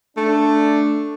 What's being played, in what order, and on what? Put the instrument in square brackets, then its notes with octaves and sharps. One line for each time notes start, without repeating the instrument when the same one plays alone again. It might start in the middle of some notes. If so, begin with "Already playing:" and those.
[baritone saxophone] A3 [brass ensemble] D4